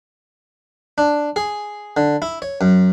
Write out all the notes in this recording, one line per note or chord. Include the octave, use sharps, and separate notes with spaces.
D4
G#4
D3
E4
C#5
F#2